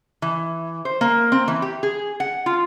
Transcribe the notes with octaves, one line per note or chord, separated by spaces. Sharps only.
E3
C5
A#3
C4
E3
G4
G#4
F#5
F4